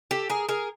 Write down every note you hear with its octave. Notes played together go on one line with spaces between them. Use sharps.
G4 A4
G#4 A#4
G#4 A#4